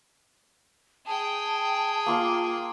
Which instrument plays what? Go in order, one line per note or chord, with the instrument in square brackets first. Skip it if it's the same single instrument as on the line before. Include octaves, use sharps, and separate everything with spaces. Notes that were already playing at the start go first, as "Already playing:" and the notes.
[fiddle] G#4 G5 [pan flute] A5
[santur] A#3 F4 F5